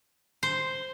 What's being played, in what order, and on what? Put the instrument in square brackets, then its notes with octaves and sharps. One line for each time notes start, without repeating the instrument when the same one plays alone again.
[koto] C5